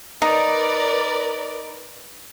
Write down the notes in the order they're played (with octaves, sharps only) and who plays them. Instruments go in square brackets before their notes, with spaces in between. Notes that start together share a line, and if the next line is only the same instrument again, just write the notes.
[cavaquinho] D#4 [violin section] A#4 B4 D5